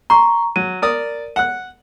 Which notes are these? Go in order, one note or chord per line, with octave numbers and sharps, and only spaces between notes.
A#5 C6 C#6
F#3 D#7
A#4 D5 D#6
F#5 F#6